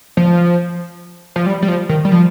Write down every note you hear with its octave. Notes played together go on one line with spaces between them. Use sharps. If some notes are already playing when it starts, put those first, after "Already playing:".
F3
F3
G3
G3
F3
D#3
G3
F3